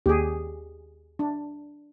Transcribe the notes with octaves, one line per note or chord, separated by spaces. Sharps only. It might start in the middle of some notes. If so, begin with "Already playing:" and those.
D#2 G4 G#4
D4